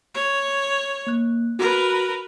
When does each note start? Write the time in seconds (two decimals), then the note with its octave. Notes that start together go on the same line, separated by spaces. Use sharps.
0.15 C#5
1.07 A#3 F#6
1.59 F#4 A#4 B4